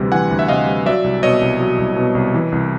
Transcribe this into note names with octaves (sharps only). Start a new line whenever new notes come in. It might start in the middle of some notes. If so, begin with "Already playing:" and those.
Already playing: D2 C3 E3 G3
E3 F#5 G#5
D2
E5
C3 D#5 F5
G3
F#3 D5 E5
C2
B2 C#5 D#5
C2
F#3
C2
B2
C2
E3
C2